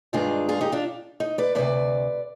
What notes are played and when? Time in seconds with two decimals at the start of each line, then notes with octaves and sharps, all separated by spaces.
0.13 G2 D#3 G#3 D4 F4 G#4
0.49 F4 G#4
0.61 D#4 G4
0.72 D4 F4
1.20 D#4
1.38 B4 D5
1.55 D2 C3 F3 B4 D5